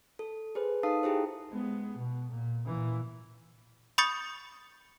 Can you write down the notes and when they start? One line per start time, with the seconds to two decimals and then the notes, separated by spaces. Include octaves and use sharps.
0.19 A4
0.55 G#4 B4 C5
0.83 D#4 A4 F5 A5 D#6 C7
1.03 E4 G4 G#4 C5
1.49 G#3 B3
1.96 B2
2.30 A#2
2.65 A#2 E3
3.98 B5 C#6 D#6 G6 A6 C#7